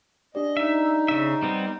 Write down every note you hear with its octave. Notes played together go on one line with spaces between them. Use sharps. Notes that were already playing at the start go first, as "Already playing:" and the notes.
D4 G4 D5 D#5
D#4 E5
C#3 E5
G3 B3 C4